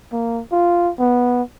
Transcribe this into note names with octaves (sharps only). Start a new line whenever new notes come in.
A#3
F4
B3